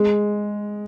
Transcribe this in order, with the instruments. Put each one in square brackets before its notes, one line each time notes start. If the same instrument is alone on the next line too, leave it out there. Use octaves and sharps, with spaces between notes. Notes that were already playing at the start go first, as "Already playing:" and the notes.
Already playing: [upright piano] G#3